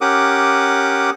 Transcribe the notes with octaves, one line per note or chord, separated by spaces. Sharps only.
C#4 G4 A#4 F#5 D6 D#6